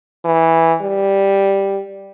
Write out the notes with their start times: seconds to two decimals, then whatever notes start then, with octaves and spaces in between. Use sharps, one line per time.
0.25 E3
0.81 G3